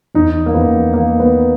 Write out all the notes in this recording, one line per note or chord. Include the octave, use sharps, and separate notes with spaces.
E2 D#4
A#3
E2 B3
D#3 A#3
B3